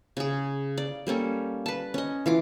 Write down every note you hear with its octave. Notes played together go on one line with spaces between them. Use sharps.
C#3 G#4
D5
G3 A#3 C#4 A4
B4 A5
C#4 D#5
E3 F4 D6